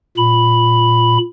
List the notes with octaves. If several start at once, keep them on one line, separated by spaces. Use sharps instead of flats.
A#2 B5